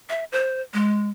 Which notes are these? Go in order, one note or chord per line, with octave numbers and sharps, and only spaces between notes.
E5
C5
G#3